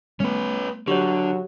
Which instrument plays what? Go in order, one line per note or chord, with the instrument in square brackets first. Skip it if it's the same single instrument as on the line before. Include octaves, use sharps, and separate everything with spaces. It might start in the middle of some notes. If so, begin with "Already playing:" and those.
[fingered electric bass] G3 A3 B3 [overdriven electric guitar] C#4 B4
[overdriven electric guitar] D3 [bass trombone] F#3 [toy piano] G4 C#5